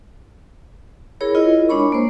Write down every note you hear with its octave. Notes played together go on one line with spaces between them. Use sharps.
E4 G#4 A#4 C#5 B5
E4 F4 A#4 D#5
G#3 D4 C#5 B5 C#6
A#3 C5